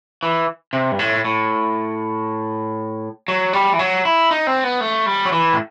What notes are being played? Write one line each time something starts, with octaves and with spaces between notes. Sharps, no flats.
E3
C3
G2
A2
A2
F#3
G3
E3
F#3
E4
D#4
C4
B3
A3
G3
F#3
E3
A2